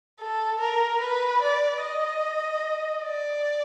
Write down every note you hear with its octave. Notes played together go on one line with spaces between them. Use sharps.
A4
A#4
B4
D5
D#5
D5